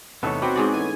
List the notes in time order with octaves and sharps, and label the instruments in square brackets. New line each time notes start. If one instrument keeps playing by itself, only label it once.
[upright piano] E2 C3 A3 [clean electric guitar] B3 D#4 C#5 [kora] A4
[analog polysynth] C4 F#4 [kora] B4 [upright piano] G5 D6
[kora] G#2 G#4 D5
[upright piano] E3 A3 C#4 [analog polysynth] G#5